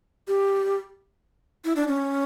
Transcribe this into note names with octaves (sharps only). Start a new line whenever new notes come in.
G4
E4
D4
C#4